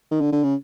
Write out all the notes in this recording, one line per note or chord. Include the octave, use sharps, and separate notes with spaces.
D#3
D3
D3
C#3